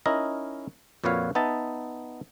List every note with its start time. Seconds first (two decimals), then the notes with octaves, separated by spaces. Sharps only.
0.06 C#4 D#4 E4 A#4 D#5
1.04 F2 A#2 F#4 B4 C#5 F5
1.35 B3 D#4 E5 A5